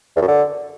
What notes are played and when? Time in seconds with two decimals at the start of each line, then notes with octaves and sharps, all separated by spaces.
0.16 E2
0.22 F#2
0.28 D3